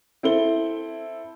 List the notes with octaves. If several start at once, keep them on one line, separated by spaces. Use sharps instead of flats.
C4 E4 A4 G7